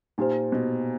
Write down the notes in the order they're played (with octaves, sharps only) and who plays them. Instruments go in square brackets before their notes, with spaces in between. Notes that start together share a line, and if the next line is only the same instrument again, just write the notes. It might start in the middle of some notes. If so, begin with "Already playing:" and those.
[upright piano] A#2 [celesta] D#4 G4 C5
[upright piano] B2